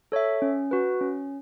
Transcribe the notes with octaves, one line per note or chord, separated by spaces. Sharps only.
A4 C#5 E5
C#4
F#4 B4
C#4